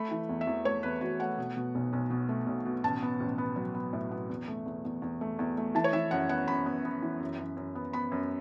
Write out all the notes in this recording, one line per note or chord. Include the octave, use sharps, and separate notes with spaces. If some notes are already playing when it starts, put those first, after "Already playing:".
Already playing: A3 B5
E3
E2
E5
E2
A3 C#5
E2 B4
E2 F#4
A3 F#5
B2
B2
B1
B1
B2
A3
B1
B2
A1 A5
B3
A1
B3
F#3
B3
A2
B3
E2
A3
E2
E2
E2
A3
E2
A3
E3 A5
C#5
E3 E5
F#2 F#5
B3 F#5
F#2 B5
B3
B3
E3
F#2
F#2
F#2
B3
B3 B5
F#2